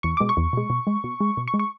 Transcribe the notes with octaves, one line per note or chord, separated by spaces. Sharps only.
E2 C#6
B2 G#3 D6
C#6
E2
B2 G#3
B2
G#3
B2
G#3
B2
C#6
G#3
C#6